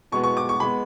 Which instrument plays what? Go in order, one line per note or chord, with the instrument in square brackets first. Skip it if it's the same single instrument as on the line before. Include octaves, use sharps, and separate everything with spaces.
[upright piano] B2 G#3 B3 C#6
C#6
D6
C#6
G#3 B3 B5